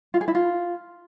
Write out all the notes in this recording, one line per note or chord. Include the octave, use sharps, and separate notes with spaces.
F4
G#4
E4
F4